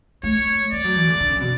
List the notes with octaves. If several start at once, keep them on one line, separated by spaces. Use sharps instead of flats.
A3 C#5
A3 D5
F#3
E3
D3
D3
C#3
B2